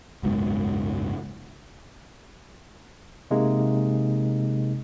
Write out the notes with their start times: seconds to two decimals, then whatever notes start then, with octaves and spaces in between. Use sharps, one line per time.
0.23 F#1 C#2 G#2 B2
3.31 C3 G#3 A#3 D#4